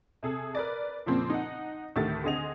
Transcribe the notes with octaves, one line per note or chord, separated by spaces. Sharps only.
C3 G#4 A4
A#4 B4 D5
F2 A#2 C#3 F3 A#3 C4
D#4 F#5
D2 A2 D#3 A3 G4 A6
D3 C4 G#4 D#5 F#5 F7